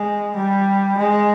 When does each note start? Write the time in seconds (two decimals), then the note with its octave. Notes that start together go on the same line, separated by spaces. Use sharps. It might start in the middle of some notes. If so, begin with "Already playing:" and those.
Already playing: G#3
0.37 G3
0.98 G#3